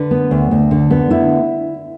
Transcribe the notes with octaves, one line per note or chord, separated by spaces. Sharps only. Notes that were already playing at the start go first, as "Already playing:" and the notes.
Already playing: D3 B4
B3
D2
D2
D3
B3
D3 E4